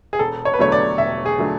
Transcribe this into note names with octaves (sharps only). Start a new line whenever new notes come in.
G#4
E1 A4
C#5
B4
E2 D3 F#3 A3 C#5
D5
E1 E5
G#4
D3 F#3 A3